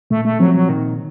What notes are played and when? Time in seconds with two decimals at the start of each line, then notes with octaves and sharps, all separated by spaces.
0.11 A#2 A3
0.25 A3
0.40 F3 F#3 C4
0.54 F#3
0.69 A#2 D#3